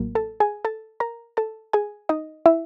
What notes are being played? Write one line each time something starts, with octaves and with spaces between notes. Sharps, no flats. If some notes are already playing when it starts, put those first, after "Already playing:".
Already playing: A1 A2 F#3 A#3
A4 A5
G#4 G#5
A4 A5
A#4 A#5
A4 A5
G#4 G#5
D#4 D#5
E4 E5